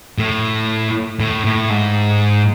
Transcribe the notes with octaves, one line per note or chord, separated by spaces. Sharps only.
A2
A2
A2
G#2